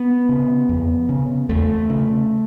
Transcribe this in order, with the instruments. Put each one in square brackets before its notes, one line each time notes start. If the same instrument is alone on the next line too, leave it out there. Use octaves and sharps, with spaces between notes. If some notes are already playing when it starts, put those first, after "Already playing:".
Already playing: [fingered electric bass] B3
C#3
F2
C#3
E2 A3
C#3